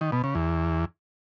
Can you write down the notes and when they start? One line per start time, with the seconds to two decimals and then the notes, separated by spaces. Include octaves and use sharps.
0.01 D#3
0.12 B2
0.24 C#3
0.35 E2